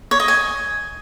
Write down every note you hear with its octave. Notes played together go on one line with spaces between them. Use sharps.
C#5
D#5
G#5